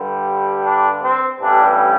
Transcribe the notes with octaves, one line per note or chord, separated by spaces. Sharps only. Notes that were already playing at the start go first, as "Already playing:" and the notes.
Already playing: G2 D3 G3
D4
C4
A1 G2 E3 G3 D4